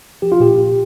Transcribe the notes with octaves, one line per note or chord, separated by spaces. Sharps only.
F3 G4
F4
A#2 G4
A#2